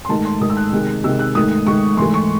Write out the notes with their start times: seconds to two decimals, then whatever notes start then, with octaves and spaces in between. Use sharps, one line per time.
0.05 C6
0.09 G#2 D#3 A3 A5
0.25 C6
0.41 G#2 D#3 A3 D#6
0.50 E6
0.57 F#6
0.72 C3 D#3 G#3
1.04 C3 D#3 G#3 E6
1.19 F#6
1.35 G#2 D#3 A3 D#6
1.67 G#2 D#3 A3 C#6
1.97 G#2 E3 A3 C6
2.14 C#6